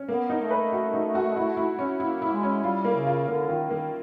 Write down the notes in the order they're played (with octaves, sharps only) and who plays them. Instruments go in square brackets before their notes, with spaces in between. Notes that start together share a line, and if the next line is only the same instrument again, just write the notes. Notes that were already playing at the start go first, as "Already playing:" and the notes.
Already playing: [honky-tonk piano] C#4
[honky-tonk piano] A#3 [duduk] B3
[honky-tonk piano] D#4
[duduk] A3
[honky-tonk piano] B4
F#4
D#4
F#4
E4
E4
C#4
[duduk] A#3 [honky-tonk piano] E4
[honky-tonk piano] E4
[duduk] G#3
[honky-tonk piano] C#4
[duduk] G3 [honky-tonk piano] F4
[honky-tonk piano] A#3
[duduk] C#3
[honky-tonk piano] F4
[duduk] D3 [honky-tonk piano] A#3
[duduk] D#3 [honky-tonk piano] F4
[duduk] D#3 [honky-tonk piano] A#3